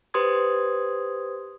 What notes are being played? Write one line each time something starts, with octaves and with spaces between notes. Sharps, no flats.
G4 B4 C5 C6 D#6 G#6